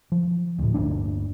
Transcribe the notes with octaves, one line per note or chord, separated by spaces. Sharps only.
F3
D2 A2
G1 D2 A#3 D4